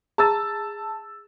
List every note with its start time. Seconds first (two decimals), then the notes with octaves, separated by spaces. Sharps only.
0.18 G#4 A5 A#5 E6 A6